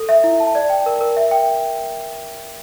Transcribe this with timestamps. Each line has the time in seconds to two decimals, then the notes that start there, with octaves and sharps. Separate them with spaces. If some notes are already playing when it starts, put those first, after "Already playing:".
Already playing: A4
0.09 E5
0.24 E4
0.40 A5
0.55 D5
0.70 G5
0.86 A#4
1.01 A#4
1.17 E5
1.31 G5